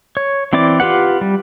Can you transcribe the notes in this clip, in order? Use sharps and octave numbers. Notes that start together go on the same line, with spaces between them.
C#5
E3 C4 E4 D5 D6
F4 G4 B4 F#5
G3